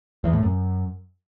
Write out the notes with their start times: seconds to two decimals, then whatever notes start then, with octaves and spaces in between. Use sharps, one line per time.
0.24 E2
0.33 A2
0.43 F#2